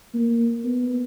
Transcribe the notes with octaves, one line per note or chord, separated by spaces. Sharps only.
A#3
B3